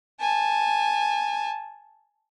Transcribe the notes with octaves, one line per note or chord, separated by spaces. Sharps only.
G#5 A5